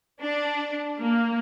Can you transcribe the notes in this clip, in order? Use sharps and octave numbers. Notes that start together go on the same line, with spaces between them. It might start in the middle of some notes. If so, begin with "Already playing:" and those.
D4
A#3